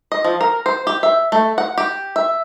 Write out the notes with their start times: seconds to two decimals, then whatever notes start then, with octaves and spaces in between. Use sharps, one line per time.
0.12 D#5
0.25 F3
0.41 A#4
0.66 C5
0.87 G4
1.03 E5
1.32 A3
1.58 F#5
1.78 G4
2.16 E5